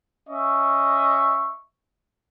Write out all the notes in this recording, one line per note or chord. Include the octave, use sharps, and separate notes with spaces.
C#4 D#5 E5 C#6